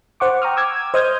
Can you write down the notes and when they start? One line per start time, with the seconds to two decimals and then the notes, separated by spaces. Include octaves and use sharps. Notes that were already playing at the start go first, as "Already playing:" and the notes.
0.20 C5 F#5 C#6 D6
0.42 G5 A#5 C#6 D#6 F6
0.57 D6 E6 G#6
0.94 C5 D#5 D#6 F6 G6 G#6